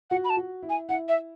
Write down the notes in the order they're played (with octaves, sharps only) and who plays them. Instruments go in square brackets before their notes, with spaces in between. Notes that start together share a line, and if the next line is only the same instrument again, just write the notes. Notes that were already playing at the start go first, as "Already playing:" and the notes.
[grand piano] F#4 [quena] F#5
[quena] B5
A5
[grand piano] F#4
E4
[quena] G#5
[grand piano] E4 [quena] F#5
[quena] E5